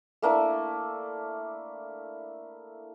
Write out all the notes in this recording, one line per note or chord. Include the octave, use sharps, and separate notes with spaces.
A3 A#3 D4 E4